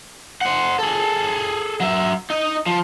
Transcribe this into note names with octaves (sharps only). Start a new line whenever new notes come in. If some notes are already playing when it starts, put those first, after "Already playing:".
C5 F#5
G#4 A4
F#3 E5
D#4 D#5
F3